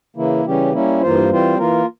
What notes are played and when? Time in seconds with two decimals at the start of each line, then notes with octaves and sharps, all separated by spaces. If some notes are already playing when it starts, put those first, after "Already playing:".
0.17 C#3 E3 A#3 E4
0.45 C#3 E3 G3 C#4 G4
0.73 G3 A#3 C#4 E4
1.02 G2 E3 A#3 F4 C5
1.29 E3 G3 C4 F4 C5
1.58 E3 A#3 F4 A#4